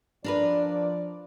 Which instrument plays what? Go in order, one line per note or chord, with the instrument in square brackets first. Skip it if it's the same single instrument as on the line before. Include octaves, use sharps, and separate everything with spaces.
[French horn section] F3 D5 [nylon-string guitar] D4 A#4 B4